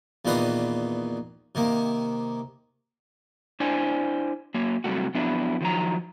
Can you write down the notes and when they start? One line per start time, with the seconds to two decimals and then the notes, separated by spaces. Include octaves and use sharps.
0.25 E2 A#2 D#3 B4 F5 D#6
1.55 C3 D#3 A#3
3.60 D4 E4 C5 D5 G#5
4.54 F#3 A#3 C#5
4.84 C3 F#3 G3 A3 F#4
5.14 F2 F#3 B3 D4 E4
5.61 D#3 F3 F#3 A#5